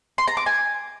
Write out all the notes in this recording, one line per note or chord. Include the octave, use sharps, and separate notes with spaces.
C6
A#5
D6
G#5